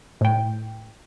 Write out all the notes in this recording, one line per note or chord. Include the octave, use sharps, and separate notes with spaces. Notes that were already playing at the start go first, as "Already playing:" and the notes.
A2 G5